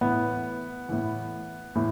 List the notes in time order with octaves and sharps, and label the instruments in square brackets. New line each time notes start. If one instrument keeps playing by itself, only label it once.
[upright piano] A2 E3 B3
A2 E3
A2 E3